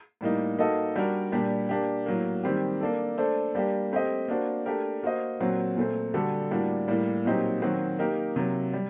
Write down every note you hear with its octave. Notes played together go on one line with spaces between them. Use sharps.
A2 G3 A#3 D#4
A#3 D#4 F#4 A4 D#5
G3 D4 F#4 A#4
A#2 G3 D4 G4
A#3 D4 G4
A2 F#3 A#3
D#3 G3 C4 G4
A#3 D4 A4
A3 D4 A4 C5
G3 A#3 D4 G4
A3 C4 G4 C5 D#5
A#3 D4 F#4 C5
A3 D4 G4 A#4
A#3 F#4 C5 D#5
A#2 F#3 C4 F#4
A#2 A3 C4
D3 G3 D4 F#4 A4
A2 G3 A#3 D4 F#4
A2 G3 A#3
A#2 F#3 C4 D#4 G4
D#3 F#3 C4 F#4
A#3 D#4 G4 A#4
C3 F#3 A#3
G3